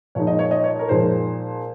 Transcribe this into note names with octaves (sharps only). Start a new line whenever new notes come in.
A#2 F3 G#3 D#4 C#5
D#5
C#5
D#5
C#5
A#4
A#2 F3 G#3 D#4 C5